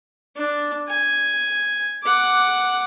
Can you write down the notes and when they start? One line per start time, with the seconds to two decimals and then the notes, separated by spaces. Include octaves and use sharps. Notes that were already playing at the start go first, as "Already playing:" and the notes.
0.36 D4
0.89 G#5
2.03 F#5 D6